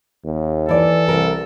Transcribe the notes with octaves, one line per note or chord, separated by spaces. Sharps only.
D#2
E3 E4 A4 D5
C2 A#4